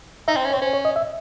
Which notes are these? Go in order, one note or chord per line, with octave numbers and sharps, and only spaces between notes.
D#4 E5
C4
C#4
C4 C#5
C#4 C5
C#5
D#5
E5